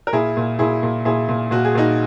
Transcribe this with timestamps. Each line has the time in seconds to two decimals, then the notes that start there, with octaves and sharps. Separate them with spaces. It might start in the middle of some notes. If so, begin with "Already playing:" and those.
0.07 A#4
0.13 A#2 E4 G#4
0.37 A#2
0.59 A#2 E4 G#4
0.83 A#2
1.05 A#2 E4 G#4
1.29 A#2
1.51 A#2 F#4
1.65 G#4
1.75 A#2 D#4 F#4